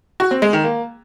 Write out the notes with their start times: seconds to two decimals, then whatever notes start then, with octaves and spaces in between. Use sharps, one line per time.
0.20 F#4
0.31 C4
0.42 G#3
0.53 D#3
0.64 A#3